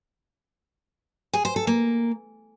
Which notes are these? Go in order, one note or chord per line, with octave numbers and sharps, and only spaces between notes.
G#4
C5
A4
A#3